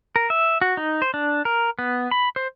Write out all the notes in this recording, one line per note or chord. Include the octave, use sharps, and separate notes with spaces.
A#4
E5
F#4
D#4
C5
D4
A#4
B3
B5
C5